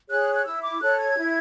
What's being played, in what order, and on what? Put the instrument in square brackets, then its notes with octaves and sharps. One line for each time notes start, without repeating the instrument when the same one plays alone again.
[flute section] G#4 C#5 F#6
F#6
E4 E6
D6
A4 C#5 F#6
G#6
E4